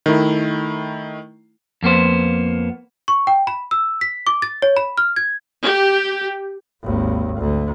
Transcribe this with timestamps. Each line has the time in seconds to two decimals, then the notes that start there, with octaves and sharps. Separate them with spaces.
0.06 D#3 A3 E4
1.83 F2 A#3 B3 C5
3.08 C#6
3.27 G5
3.47 B5
3.71 E6
4.01 B6
4.27 D6
4.42 A6
4.62 C#5
4.77 B5
4.98 F6
5.16 G#6
5.65 G4
6.82 G#1 D#2
7.39 D2